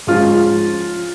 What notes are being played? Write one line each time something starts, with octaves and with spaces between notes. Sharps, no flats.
G#2 F3 G#3 C#4 F4